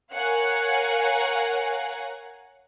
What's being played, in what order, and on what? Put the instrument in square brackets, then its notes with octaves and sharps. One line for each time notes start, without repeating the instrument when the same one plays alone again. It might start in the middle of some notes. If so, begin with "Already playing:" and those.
[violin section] A#4 C#5 F5 F#5 G#5